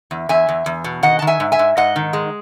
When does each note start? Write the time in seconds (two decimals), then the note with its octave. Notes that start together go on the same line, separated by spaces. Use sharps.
0.11 E2
0.29 E2 E5 G#5
0.49 E2
0.66 E2
0.84 B2
1.03 D#3 D#5 F#5
1.19 D#3 A5
1.27 E5 G#5
1.40 G#2
1.52 E5 G#5
1.59 G#2
1.77 G#2 D#5 F#5
1.96 D#3
2.13 G#3